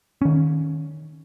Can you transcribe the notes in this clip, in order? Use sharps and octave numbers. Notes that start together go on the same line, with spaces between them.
D#3 C#4